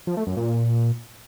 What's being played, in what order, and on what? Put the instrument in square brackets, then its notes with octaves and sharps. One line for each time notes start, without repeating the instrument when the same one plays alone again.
[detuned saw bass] F3
A3
F#2
A#2